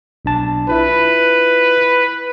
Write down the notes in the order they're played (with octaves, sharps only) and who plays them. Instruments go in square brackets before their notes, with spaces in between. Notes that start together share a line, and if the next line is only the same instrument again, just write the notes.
[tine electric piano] B1 D4 A5
[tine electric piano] E4 F4 [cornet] B4